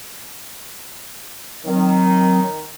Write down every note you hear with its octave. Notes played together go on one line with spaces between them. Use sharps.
D#3 F#3 C4